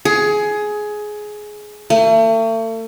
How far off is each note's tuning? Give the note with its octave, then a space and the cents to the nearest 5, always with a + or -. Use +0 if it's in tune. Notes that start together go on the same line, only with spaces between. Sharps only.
G#4 +15
A3 +40